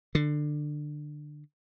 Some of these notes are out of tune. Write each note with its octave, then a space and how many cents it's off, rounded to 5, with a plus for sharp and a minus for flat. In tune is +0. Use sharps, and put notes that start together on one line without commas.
D3 +20